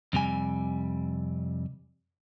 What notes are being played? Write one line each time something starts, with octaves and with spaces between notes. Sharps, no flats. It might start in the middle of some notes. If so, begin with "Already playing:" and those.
F2 C3 G3 G#5